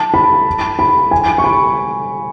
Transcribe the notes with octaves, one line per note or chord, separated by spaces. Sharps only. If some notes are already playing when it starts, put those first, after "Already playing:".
Already playing: A5
B5
B5
G#5
C#6
B5